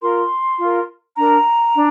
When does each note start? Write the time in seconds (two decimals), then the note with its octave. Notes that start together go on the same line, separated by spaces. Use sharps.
0.01 F4 A#4 C6
0.59 F4 A#4
1.17 D4 A#4 A#5
1.75 D4